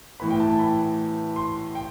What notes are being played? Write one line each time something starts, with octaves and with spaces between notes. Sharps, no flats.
A2 E3 B3 B5
G5
A5
A5
B5
C6
G5